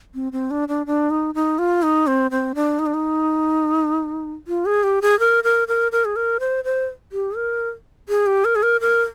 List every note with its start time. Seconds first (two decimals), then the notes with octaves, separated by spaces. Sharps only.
0.14 C4
0.32 C4
0.51 D4
0.68 D4
0.86 D4
1.10 D#4
1.35 D#4
1.59 F4
1.83 D#4
2.07 C4
2.31 C4
2.55 D4
2.79 D#4
2.86 D4
2.94 D#4
4.47 F4
4.66 G#4
4.83 G4
5.02 G#4
5.20 A#4
5.44 A#4
5.68 A#4
5.92 A#4
6.05 G#4
6.16 A#4
6.40 C5
6.64 C5
7.12 G4
7.36 A#4
8.09 G#4
8.27 G4
8.45 A#4
8.56 G#4
8.63 A#4
8.81 A#4